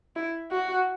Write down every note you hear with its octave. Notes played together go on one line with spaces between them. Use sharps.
E4
F#4